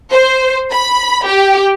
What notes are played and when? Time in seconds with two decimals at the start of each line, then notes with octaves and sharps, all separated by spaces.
0.11 C5
0.72 B5
1.26 G4